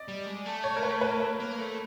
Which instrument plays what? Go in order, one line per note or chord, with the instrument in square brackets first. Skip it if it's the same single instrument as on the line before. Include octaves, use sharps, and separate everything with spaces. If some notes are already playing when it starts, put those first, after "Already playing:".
Already playing: [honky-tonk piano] D5 D#5
[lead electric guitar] G3
G#3
A3
[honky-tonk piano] C#5
A#4
B4
B4
A#4
B4
[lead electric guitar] A#3
A3